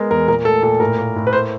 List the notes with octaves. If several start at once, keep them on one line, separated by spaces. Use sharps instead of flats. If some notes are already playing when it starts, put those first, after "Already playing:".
Already playing: G#3 B3 A#4
E2 A#4
A#2 A#4
A3 A4
A#2 A4
A2 A#4
A#3
A2
B4
A3 C5